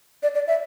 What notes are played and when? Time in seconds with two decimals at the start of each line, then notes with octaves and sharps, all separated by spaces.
0.23 D5
0.35 D5
0.47 E5